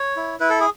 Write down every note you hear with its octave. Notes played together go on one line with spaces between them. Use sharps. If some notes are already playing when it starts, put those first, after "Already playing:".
Already playing: C#5
E4
E4 B4
A4
G#4